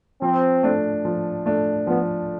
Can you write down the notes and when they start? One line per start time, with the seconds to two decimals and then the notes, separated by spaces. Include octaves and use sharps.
0.21 F3 C4
0.63 A3 D4
1.05 F3
1.46 A3 D4
1.87 F3 B3